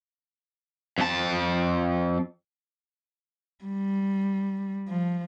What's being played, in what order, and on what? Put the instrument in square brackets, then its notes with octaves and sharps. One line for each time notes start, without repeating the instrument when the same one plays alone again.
[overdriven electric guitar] F2 A5
[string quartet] G3
F3